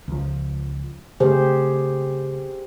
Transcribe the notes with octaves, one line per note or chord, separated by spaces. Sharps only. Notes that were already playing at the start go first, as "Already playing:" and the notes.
C#2 F3
C#3 A3 G4 G#4 C5